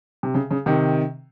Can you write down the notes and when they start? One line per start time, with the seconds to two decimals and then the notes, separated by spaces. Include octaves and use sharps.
0.23 C3
0.34 C#3
0.51 C#3
0.66 C3 D#3